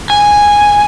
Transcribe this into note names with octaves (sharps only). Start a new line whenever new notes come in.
G#5